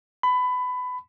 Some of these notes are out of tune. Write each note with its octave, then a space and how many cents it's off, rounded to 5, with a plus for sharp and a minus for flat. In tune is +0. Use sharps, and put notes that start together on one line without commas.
B5 +20